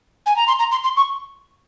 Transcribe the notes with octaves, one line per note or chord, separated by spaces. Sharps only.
G#5
A#5
C6
A#5
C6
C6
C#6